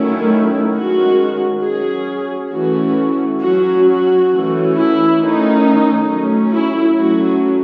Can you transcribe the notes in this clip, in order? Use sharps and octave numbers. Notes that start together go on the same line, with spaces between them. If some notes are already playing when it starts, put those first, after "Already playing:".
Already playing: D#3 F#3 A3 C#4 E4
D#3 G#3 C#4 F#4
F#3 C#4 G#4
E3 A3 C#4 F#4
F#3 C#4 F#4
F#4
E3 A3 C#4
E4
D#3 A3 C#4 D#4
F#3 A3 C#4
E4
F#3 A3 C#4 F#4